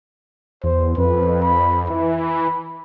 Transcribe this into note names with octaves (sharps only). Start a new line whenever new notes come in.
E2 C5
F2 B4
B5
E3 E4
B5